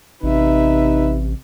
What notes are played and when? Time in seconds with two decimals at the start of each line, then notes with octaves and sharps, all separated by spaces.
0.23 A1 C3 D#4 B4 E5